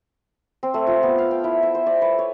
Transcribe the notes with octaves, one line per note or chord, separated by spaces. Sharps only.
C4
A3
F4
B3
F5
G5
E4
E5
C5
D5
B4
C#5